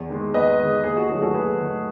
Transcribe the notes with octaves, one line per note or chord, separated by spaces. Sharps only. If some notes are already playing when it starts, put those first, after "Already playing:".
Already playing: E2
D#3 G#3
E2 B4 D#5
D#3 G#3
D#2 G#4
F#4
D#3 F#3 A3 G#4
F#4 A4
D#2 G#4 B4
D#3 F#3 A3